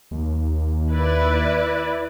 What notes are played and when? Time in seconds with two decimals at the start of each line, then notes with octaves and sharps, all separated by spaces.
0.11 D#2
0.90 E4 B4 D5